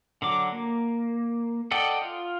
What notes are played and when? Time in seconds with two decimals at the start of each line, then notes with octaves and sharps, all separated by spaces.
0.22 D3 F#3 D6
0.52 A#3
1.71 A4 D5 D#5 F#5 G5
2.02 F4